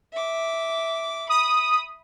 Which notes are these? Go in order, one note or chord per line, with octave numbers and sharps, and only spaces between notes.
E5 D6
B5 D#6